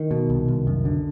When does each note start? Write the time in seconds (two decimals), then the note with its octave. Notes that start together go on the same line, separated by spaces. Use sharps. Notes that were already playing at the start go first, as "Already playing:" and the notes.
Already playing: D#3
0.11 B2
0.30 C2
0.48 C2
0.67 F#2
0.85 D3